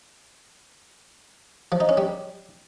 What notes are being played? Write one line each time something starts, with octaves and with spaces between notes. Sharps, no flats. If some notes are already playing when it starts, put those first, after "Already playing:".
F3
D#4
C#4
G3